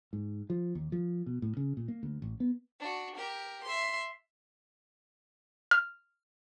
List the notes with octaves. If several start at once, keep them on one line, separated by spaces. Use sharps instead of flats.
G#2
F3
D#2
F3
B2
A2
C#3
A#2
A#3
D2
A1
B3
D4 F#4
G4 A#4
E5 C6
F6